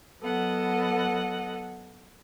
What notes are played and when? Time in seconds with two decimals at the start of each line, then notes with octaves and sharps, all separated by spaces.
0.21 F#3 B3 A4 D#5 F#5